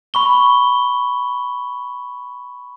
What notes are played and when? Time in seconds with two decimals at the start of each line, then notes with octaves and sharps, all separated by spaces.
0.14 B5 C#6 G7